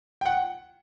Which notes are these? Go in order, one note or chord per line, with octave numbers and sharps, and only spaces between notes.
G5
F#5